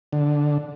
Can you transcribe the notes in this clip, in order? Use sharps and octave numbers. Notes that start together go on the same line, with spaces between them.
D3